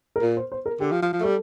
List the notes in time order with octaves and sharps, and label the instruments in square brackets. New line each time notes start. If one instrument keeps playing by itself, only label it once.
[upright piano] A#4
[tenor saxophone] A#2
[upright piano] C5
C5
A#4
[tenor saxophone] D3 [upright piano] G4
[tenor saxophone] F3
F3
F3
A3
[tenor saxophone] G3 [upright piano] A4